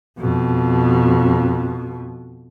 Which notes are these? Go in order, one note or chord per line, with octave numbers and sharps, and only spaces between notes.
F2 B2